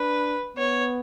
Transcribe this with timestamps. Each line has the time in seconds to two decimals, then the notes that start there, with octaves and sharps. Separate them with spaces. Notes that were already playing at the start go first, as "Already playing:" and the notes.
Already playing: D4 B4
0.57 B3 C#5